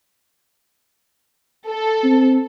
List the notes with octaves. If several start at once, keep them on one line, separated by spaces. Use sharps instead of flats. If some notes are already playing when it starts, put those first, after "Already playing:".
A4
C4